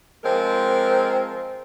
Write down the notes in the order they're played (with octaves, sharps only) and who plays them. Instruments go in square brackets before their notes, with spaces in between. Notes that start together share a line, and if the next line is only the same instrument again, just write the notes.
[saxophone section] F3 G#3 C4 A#4